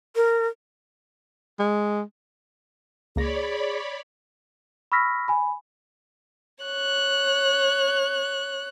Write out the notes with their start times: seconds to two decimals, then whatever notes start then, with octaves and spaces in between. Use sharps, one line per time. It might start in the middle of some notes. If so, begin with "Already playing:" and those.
0.16 A#4
1.59 G#3
3.16 C#2 A#3 G#4 C#5 D5 B5 A#6
4.92 B5 C#6 E6 F6 A#6 B6
5.28 G#5 B5
6.64 C#5 F#6